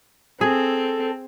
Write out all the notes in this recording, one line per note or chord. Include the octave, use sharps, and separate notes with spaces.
C4 G#4 A4